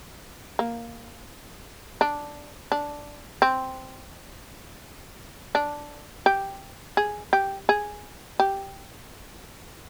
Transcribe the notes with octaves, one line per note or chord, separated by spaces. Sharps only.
A#3
D4
D4
C4
D4
G4
G#4
G4
G#4
G4